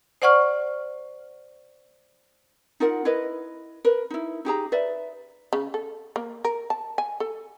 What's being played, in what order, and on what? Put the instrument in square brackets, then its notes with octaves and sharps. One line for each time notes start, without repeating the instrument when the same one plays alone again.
[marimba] C5 D5 F#5 C#6 F6
[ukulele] D#4 F4 A#4 F#5
E4 A#4 B4 D#5
A#4 B4
D#4 E4
D#4 G4 G#4 A#5
B4 D5 E5
[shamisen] C#3
A4
A#3
A#4
A5
G#5
A4